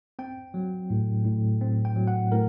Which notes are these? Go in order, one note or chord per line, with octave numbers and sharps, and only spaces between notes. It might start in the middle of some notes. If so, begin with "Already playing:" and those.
C4 G5
F#3
A2
A2
C4
G5
F#3
F#5
A2 A#4